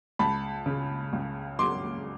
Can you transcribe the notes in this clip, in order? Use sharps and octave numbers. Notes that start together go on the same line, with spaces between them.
C#2 A5 B5
C#3
C#2
F#3 C6 D6